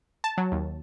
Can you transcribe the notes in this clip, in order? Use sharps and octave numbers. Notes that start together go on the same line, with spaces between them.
A5
F#3
D#2